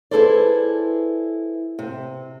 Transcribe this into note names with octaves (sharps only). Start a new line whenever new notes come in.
E4 G#4 A4 B4 C5 D5
C3